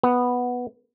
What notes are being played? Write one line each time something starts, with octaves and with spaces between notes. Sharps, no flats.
B3